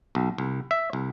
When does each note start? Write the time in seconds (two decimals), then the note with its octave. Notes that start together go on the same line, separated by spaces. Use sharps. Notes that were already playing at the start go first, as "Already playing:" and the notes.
0.15 B1
0.38 C2
0.71 E5
0.93 C2